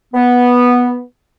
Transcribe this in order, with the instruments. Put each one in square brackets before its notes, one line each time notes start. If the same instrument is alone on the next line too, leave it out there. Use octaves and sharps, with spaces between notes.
[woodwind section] B3